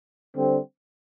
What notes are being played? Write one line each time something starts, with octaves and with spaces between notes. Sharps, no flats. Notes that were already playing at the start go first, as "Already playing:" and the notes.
D3 G3 C4